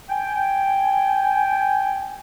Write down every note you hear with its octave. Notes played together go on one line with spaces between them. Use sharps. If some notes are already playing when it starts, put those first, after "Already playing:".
G5 G#5